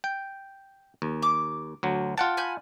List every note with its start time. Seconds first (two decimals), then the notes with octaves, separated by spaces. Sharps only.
0.04 G5
1.02 D#2
1.22 D6
1.83 D2 F#3
2.18 F4 F#5 G5 A5
2.37 G#5 B5 G6